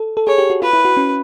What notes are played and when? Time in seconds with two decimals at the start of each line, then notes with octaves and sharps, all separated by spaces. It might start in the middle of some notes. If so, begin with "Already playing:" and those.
Already playing: A4
0.17 A4
0.27 G#4 C#5
0.38 G4
0.50 F#4
0.62 F4 B4
0.73 E4
0.85 F#4
0.97 C#4